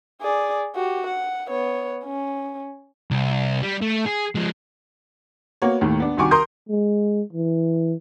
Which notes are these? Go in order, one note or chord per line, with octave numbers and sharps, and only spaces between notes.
G#4 D5
F#4 G4
F#5
B3 C#5
C#4
C2
G3
A3
G#4
F3 G#3
A#3 B3 F#4 B4 C#5
D#2 A2 D#3
B3 D4
C2 D#3 F#4 G#5 C#6 D6
A#4 C6 D#6 G6
G#3
E3